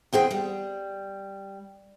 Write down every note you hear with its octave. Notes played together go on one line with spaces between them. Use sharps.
E2 C4 G#4 G5
G3